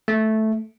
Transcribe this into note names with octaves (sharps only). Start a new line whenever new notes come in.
A3